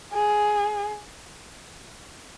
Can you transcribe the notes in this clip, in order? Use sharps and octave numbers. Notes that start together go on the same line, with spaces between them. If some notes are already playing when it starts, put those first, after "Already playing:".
G#4